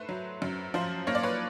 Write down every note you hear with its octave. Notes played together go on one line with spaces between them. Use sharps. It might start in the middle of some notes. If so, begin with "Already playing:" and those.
Already playing: A3 B4 C5
F#3
F#2
F3 C5
A#3 C#5
D5
B4 C#5